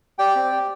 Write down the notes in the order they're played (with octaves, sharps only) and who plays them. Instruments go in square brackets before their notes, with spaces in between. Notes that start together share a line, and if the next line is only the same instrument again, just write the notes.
[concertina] G4 D5 G5
C4
G4